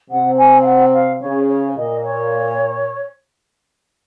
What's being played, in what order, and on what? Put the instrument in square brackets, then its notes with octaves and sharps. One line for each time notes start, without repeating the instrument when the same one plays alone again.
[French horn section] C3 [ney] F#5
[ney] G#5
F5
F#5
F5
[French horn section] C#3 [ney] C#5
[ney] C#5
[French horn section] A#2 [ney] D#5
[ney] C#5